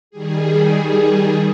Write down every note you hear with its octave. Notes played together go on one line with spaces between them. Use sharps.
D#3 G3 G#4